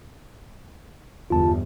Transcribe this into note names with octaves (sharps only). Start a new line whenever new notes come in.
G1 E2 G3 F4 A5